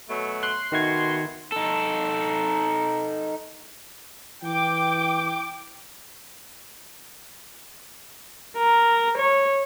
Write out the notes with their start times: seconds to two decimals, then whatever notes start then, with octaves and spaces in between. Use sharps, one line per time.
0.09 B2 F#3 A3
0.43 C6 F#6
0.72 B2 D#3 A3 F#4 G#6
1.52 D#4 A4
4.43 E3 G5 D6
8.58 A#4
9.18 C#5